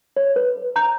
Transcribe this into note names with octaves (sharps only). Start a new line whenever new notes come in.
C#5
B4
A#5 G6